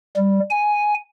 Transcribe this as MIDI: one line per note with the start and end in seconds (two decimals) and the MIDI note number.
0.16 0.39 55
0.50 0.94 80